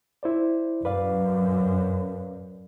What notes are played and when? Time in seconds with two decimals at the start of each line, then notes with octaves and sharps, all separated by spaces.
0.23 E4 C5 D5
0.85 F#2 B4 D5 F5